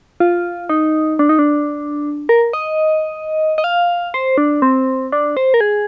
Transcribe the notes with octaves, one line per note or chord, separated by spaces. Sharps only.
F4
D#4
D4
D#4
D4
A#4
D#5
D#5
F5
C5
D4
C4
D4
C5
A#4
G#4